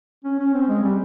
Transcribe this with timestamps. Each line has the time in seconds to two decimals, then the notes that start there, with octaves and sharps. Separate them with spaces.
0.25 C#4
0.39 C#4
0.54 C4
0.69 G#3
0.84 G3